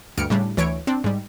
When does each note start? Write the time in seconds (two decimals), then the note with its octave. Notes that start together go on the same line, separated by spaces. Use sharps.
0.17 D2 G2 F6 C#7 D7
0.30 A2 C#3 G3 D4
0.57 D2 E3 C#5 D7
0.87 C4 D4
1.04 G#2 G3